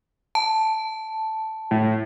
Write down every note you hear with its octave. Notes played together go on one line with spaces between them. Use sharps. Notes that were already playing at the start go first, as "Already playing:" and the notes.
A5
A2